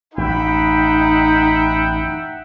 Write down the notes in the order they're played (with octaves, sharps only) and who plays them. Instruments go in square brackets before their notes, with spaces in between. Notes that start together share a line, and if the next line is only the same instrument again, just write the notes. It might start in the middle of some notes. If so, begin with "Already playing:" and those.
[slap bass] A1 F#2 [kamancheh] D#4 [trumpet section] E5 F#5 G5 [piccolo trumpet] B5